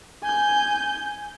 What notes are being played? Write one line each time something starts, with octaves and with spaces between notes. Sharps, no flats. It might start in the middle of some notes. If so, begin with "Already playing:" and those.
G#5 G6